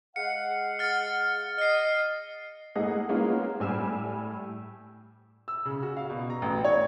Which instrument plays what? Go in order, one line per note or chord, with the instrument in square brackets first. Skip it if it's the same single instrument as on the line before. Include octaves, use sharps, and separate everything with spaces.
[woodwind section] G#3 F5 F#5 [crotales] C#7
[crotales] F6 A6 C#7
[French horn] D#5 [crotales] F6 C7
[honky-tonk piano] A3 A#3 E4 G#4 D#5 F#5
G#3 A#3 B3 C#4 F4
A2 G3 G#5 E6 F6 E7
[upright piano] E6
C#3
F#4
F5
B2
A#5
A1
C#5